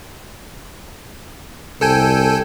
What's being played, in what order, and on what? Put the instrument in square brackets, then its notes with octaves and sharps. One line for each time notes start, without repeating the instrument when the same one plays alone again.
[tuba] C2 [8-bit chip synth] A4 G5 G#5